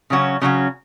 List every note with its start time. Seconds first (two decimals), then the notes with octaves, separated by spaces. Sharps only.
0.10 C#3 F#3 C#4 F#4
0.41 C#3 F#3 C#4 F#4